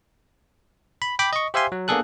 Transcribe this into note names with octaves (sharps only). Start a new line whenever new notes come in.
B5
G5 B5 D6
D#5 C#6
G4 C5 E5 F5 G#5 C6
F#3
A#3 B3 D4 G#4 A4 F#6